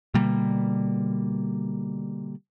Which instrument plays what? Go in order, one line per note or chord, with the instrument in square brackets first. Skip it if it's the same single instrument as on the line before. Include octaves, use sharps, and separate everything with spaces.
[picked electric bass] B2 D3 G3 A#3